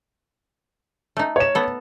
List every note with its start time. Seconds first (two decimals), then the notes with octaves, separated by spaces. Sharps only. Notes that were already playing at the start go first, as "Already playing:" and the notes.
1.17 A3 D#4
1.36 C#5 E7
1.55 B3 A4